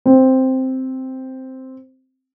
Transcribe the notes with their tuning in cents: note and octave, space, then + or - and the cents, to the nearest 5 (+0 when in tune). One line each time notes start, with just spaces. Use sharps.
C4 +0